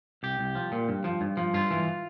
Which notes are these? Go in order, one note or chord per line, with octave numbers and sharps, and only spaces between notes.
C2 G4
C2
F3
A#2
G2
F3
G2
F3
G2 F4
E3